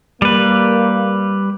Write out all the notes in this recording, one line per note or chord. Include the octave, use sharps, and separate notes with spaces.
G3 A#3 B4